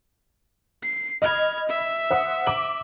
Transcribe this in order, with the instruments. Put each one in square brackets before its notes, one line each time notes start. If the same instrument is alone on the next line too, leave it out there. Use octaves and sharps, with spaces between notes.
[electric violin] C7
[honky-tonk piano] D#5 B5 [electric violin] F6 G#6
[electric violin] E5
[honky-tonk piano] C5 F#5 D#6
D6 F#7